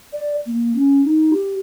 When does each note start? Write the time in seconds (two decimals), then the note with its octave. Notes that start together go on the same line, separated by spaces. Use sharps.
0.13 D5
0.46 A#3
0.75 C#4
1.05 D#4
1.33 G4